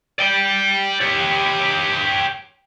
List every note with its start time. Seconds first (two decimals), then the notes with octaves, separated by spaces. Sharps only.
0.19 D5 G5
1.01 G4 C#5